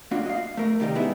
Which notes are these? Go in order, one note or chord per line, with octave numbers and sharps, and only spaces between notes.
A#3 D4 F4 F#4
D#5 F5
A3 A#4
C3 D#3 G3 D#4
G#3 B3 E4